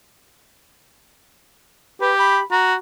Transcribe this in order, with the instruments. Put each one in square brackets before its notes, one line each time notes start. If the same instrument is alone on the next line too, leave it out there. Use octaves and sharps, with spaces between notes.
[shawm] G4 [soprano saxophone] B4
[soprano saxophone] B5
[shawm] F#4 [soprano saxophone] A#5